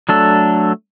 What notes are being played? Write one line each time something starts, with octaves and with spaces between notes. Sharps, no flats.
F#3 A3 D4 A4